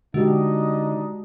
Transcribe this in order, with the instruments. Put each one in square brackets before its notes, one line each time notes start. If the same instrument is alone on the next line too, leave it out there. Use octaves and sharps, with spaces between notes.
[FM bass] D3 [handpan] G#3 F#4 G4 [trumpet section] D4 D#4 D#5